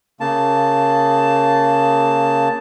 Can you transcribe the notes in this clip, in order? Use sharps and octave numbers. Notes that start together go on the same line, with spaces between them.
C#3 A#3 A5